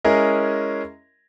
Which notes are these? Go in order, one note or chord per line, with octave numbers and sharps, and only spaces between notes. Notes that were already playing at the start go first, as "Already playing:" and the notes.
G#3 C#4 E4 G#4 A#4 D#5